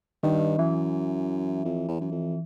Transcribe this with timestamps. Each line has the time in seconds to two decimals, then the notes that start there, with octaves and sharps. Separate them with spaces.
0.23 G2 D#3
0.58 F#2 E3
1.65 F2
1.88 E2
2.01 F#2
2.12 F2